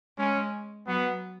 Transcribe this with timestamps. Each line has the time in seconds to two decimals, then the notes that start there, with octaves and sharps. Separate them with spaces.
0.18 G#3 C#4
0.87 F#3 B3